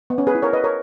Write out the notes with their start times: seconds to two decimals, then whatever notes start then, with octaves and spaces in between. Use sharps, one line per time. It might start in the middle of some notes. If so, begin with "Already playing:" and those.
0.10 B3
0.18 C#4
0.27 G#4 B4
0.35 E4
0.42 A#4 C#5
0.53 B4 D#5
0.64 A#4 C#5